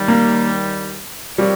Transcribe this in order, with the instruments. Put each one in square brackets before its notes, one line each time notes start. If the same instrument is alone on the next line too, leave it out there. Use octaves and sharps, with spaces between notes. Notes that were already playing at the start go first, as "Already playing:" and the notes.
Already playing: [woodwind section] D#2 D#3 G3
[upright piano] A#3
[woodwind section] F3 C4 G4 A#4 C#5 [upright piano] G3